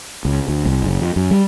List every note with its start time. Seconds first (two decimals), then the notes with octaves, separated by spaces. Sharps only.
0.25 C#2
0.48 D2
0.66 C2
0.82 F#1
1.01 F2
1.16 F#2
1.31 G3